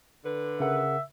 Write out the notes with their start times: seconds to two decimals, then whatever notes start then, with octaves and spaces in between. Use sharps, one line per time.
0.25 D3 B4
0.60 C#3 A#4 E5 F#5